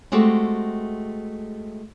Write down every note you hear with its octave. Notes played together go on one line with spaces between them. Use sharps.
G#3 A3 C4 F#4 G4